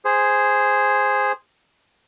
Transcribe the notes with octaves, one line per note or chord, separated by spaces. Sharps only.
G#4 C5